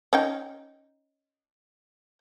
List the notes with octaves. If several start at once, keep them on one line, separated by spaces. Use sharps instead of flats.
C#4 D#4 G5